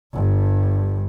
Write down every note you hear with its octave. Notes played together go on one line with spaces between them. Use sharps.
G1 G2